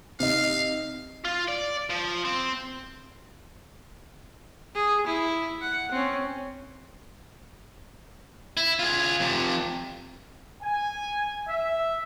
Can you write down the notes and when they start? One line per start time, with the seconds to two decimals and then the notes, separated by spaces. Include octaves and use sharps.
0.20 C3 D#4 F5
1.25 F4
1.48 D5
1.90 F3
2.25 C4
4.74 G#4
5.06 E4
5.61 F#5
5.91 C4 C#4
8.57 E4
8.79 F4 G#4
9.20 F2 C3
10.62 G#5
11.48 E5